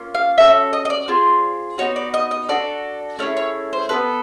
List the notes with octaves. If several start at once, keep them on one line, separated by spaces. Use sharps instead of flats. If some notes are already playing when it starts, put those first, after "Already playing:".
Already playing: A#3 C#4 F4
F5
C#4 F#4 A4 E5
D#5
D#5
D5
C4 F4 G#4
B3 D#4 F#4 C#5
D5
D#5
D#5
D4 F#4 A4 D5
A3 C#4 E4 G#4 C#5
C#5
C5
B3 E4 A4 B4